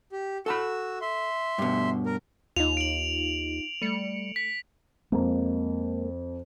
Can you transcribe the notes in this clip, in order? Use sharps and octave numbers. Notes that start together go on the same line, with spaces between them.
G4
F#4 A4 A5 B5 E6
E5 C6
G2 B2
A#4
D#2 D#4 F4 F7
D7 F#7
G3 A3 C#7
B6
F2 G#3 A#3